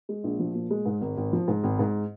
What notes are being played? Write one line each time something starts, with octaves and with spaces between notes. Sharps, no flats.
G#3
A#1
F3
A#2
G#3
G#2
G#1
G#1
F3
G#2
G#1
G#2